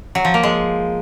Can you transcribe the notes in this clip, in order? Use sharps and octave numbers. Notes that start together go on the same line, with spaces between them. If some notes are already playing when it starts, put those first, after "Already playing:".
F#3
F3
A#3
G#3